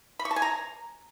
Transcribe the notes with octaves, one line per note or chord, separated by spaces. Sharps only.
B5
C#6
A5
G#5
A#5